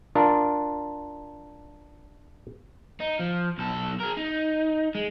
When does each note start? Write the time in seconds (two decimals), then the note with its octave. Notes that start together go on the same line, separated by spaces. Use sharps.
0.15 D4 F4 A#4
3.00 D#4
3.19 F3
3.58 B1 A4
4.00 G#4 A#4
4.17 D#4
4.95 G#3